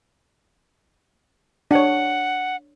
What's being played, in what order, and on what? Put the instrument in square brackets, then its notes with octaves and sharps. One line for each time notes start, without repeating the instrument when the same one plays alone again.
[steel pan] D4 C#5 [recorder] F#5